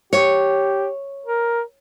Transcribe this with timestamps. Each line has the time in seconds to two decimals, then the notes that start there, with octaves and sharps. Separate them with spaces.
0.13 G4 C#5
1.26 A#4